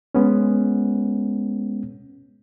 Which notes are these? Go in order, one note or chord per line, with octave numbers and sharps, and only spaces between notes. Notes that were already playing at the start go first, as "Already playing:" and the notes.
G#3 B3 C#4